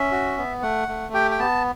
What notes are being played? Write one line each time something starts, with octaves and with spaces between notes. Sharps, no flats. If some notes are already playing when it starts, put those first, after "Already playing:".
Already playing: C#4 E5
F#4
B3
A3 F#5
A3
G4 G5
G5
B3 A5